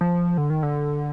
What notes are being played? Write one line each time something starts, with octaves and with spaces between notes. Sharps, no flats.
F3
D3
D#3
D3